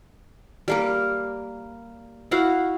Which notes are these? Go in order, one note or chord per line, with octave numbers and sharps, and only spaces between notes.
G3 A#3 A#4
E4 F#4 F5 F#5